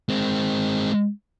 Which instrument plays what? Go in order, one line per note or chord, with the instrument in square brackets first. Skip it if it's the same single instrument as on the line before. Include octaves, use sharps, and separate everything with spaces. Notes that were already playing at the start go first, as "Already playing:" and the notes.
[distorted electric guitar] G#3 C4